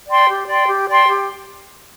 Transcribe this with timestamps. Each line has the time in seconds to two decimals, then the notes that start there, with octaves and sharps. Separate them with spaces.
0.08 D5 G5 C6
0.28 G4
0.47 D5 G5 C6
0.67 G4
0.89 D5 G5 C6
1.08 G4